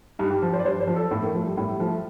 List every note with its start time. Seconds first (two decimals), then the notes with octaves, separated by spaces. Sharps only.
0.19 G2 D#4
0.30 G4
0.42 F3
0.53 C5
0.59 D5
0.65 G2 C5
0.81 C5
0.87 F3
0.96 A4
1.11 A2 A4
1.23 A#3
1.34 F3 A3
1.45 G3
1.57 A2 G3
1.80 F3 A3